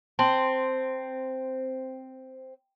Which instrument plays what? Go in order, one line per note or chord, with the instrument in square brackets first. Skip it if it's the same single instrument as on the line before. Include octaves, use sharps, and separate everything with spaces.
[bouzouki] C4 [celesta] A5 C6 F#7